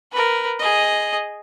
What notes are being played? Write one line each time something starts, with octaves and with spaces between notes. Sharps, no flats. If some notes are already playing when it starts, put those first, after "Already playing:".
A#4 B4
G#4 D#5